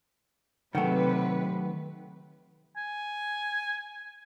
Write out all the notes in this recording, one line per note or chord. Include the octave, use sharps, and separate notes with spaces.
C3 D#3 F#3 A3 B4 F#5 G5
G#5